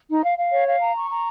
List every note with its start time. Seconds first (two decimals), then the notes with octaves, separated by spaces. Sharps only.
0.09 D#4
0.24 F5
0.37 F5
0.52 C#5
0.67 F5
0.81 A#5
0.96 C#6
1.10 A#5